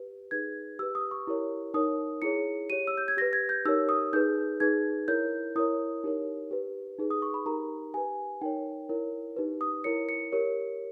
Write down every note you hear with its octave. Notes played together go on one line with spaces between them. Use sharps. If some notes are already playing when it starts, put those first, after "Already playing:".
Already playing: G4 B4
D#4 G#4 B4 G#6
G4 B4 E6
D#6
C#6
E4 G4 A#4 C#5
D#4 A#4 C#5 D#6
E4 G#4 C#5 C#7
G4 C#5 D#7
E6
G6
G#6
G4 B4 A#6
G#6
G6
D#4 G4 A#4 C#5 E6
D#6
D#4 G#4 B4 G6
D#4 G#4 B4 G#6
E4 A#4 C#5 G6
E4 A#4 C#5 D#6
D#4 G4 A#4 C#5
G4 B4
D#4 G#4 B4
D#6
C#6
B5
D#4 G4 A#4 A#5
G4 B4 G#5
D#4 A#4 C#5 G5
E4 A#4 C#5
D#4 G4 B4
D#6
E4 A#4 C#5 C#7
C#7
G4 A#4 C#5